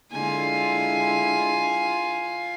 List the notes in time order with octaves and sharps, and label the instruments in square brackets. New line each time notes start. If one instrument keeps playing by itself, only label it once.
[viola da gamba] D3 G#3 E4 [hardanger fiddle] F4 G#5